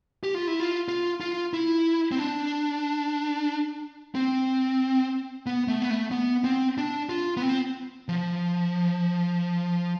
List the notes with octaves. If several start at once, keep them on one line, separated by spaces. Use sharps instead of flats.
G4
F4
E4
F4
F4
F4
E4
C4
D4
C4
B3
A3
B3
A3
B3
C4
D4
F4
B3
C4
F3